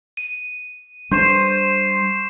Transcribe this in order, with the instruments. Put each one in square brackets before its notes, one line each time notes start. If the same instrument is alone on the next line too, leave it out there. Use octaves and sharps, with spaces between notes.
[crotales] D#7
[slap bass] G3 D4 [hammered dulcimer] C5 [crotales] C#6 C7 E7